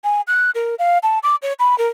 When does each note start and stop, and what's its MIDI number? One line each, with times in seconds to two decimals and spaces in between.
0.04 0.21 80
0.27 0.51 90
0.55 0.75 70
0.79 0.98 77
1.03 1.19 81
1.23 1.36 86
1.42 1.53 73
1.59 1.77 83
1.78 1.88 70